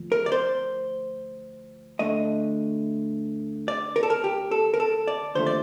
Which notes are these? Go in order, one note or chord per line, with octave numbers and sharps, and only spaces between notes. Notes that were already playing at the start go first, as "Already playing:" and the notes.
Already playing: D2 F3
A#4
D5
C5
D2 D3 A3 D#5
D5
A#4
A4
A#4
G4
A4
A#4
A4
D5
D#2 D3 F3 A3 C5
D5